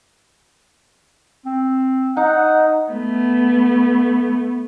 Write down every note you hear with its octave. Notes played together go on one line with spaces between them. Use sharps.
C4
D#4 F#5
A3 B3